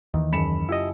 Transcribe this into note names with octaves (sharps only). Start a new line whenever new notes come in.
D#2 D#3 E3
F#1 B5 C#7 E7
E4 F4 G4 D#5